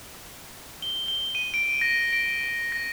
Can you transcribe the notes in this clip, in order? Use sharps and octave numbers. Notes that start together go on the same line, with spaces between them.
G7
G7
D#7
D7
A#6
D7
A#6